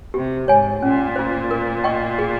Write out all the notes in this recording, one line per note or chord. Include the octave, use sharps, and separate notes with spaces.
C3 G4
G#2 C#5 G#5
A#2 C#4
F4 C5
A#4
D#5 G5 C#6
G#4